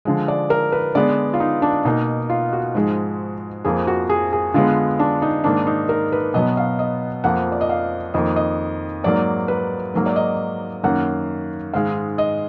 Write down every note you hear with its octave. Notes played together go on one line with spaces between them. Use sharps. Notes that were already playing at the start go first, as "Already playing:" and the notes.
D3 F3 G#3
D5
A#4
B4
D3 G#3 B3 D5
F4
D#4
D4
B2 A#3 D#4
F4
F#4
G#2 F3 G#3
F2 F3 A#3 G#4
F#4
G#4
G#4
D3 G#3 B3 F4
D4
D#4
G#2 D#3 A#3 D4
D#4
A#4
B4
B2 F#3 B3 D#5
F5
D#5
F2 F3 A#3 F#5
D5
D#5
F5
F2 D#3 A#3 D#5
D#5
G#2 F#3 A#3 D5
B4
G#2 F#3 A#3
D5
D#5
F#2 D#3 A#3 F#5
G#2 D#3 G#3 F5
D#5